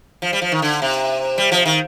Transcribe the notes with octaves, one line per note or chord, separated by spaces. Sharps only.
F3
G3
F3
D#3
D3
C3
G3
F3
D#3